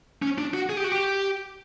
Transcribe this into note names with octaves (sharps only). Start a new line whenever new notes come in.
C#4
D4
F#4
G#4
G4
F#4
G4